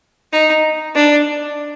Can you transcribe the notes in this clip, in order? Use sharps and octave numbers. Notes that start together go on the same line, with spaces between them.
D#4
D4